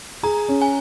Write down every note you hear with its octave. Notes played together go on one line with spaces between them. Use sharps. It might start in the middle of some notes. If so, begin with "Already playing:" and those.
G#4 A#5
C#4
G#5